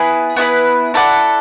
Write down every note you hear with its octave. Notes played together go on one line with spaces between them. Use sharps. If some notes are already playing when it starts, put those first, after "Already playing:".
Already playing: B3 E4 G#4 B4
B3 E4 G#4 B4
E4 A4 D5 F#5